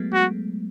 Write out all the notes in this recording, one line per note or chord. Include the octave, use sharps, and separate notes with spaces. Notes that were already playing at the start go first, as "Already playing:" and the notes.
Already playing: F#3 G#3 A3 B3
G#3 B3 F#4